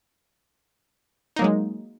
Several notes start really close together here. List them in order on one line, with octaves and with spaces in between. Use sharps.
D#4 A#3 F#3 G#3